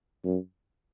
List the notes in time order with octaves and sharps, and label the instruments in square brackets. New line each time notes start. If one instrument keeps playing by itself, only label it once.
[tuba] F#2